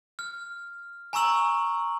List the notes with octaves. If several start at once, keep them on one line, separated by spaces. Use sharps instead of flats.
F6
G#5 A#5 C#6 E6 F#7